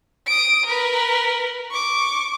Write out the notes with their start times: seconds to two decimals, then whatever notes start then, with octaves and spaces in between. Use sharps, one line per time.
0.26 D#6 D7
0.65 A#4 B4
1.70 C#6 D6